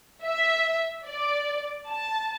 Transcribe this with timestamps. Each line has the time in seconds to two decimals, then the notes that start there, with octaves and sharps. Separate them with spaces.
0.24 E5
1.05 D5
1.87 A5